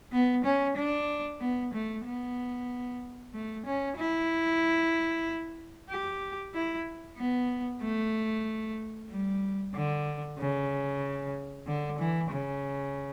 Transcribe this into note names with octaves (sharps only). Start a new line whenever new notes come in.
B3
C#4
D4
B3
A3
B3
A3
C#4
E4
G4
E4
B3
A3
G3
D3
C#3
D3
E3
C#3